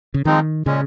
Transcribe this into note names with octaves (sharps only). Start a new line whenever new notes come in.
C#3
D#3 F3 G#3 C4 D#4
A#2 C#3 G#3 C#4